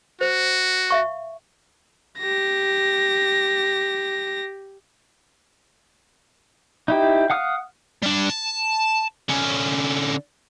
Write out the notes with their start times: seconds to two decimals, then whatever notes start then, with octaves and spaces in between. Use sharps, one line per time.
0.21 F#4 C5
0.90 E5 F5 C#6
2.19 G4 A#6
6.88 D#4 E4 G4
7.30 F5 F#5 D#6 F6
8.03 G3 D4
8.30 A5
9.29 D3 C#4